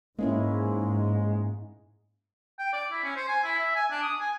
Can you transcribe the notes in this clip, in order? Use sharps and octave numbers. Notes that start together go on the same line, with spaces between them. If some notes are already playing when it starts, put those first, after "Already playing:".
G#2 G#3 A#3 C#4 E4
G5
D5
E4
C#4
C5
G#5
E4
E5
G#5
D4
D#6
G#5